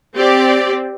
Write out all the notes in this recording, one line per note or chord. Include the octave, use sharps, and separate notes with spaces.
C4 G4 D5